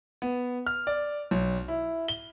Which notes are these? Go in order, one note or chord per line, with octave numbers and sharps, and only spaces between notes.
B3
F6
D5
B1
E4
G7